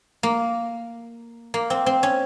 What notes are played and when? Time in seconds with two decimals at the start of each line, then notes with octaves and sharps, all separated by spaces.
0.23 A#3
1.54 A#3
1.70 C4
1.86 C4
2.03 C#4